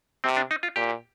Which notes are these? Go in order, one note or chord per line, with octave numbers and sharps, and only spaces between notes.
C3 C4
D4
D#4
F4
A#2 G4